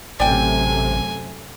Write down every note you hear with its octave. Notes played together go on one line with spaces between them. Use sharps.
A1 F#2 C3 A3 D5 G5 G#5